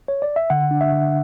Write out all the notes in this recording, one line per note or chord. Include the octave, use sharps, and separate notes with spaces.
C#5
D5
E5
D3 F#5
D4
E5
D3